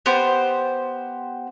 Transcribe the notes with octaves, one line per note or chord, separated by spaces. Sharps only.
B3 G4 C5